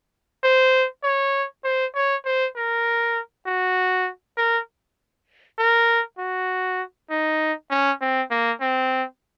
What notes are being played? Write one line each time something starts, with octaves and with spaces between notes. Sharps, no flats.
C5
C#5
C5
C#5
C5
A#4
F#4
A#4
A#4
F#4
D#4
C#4
C4
A#3
C4